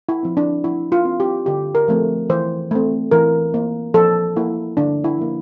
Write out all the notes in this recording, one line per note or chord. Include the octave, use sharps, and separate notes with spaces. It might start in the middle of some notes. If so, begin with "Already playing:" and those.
E4
F3 C4
D4
F3 E4
F4
C4
G4
D3 G4
A#4
F3 A3 C4
E3 C5
A3 C4
E3 A#4
A#3
F3 A4
A#3 E4
D3 D4
E4
F3 A#3